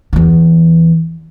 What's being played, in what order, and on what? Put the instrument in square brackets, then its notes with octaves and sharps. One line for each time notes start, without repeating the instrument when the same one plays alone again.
[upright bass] E2 E3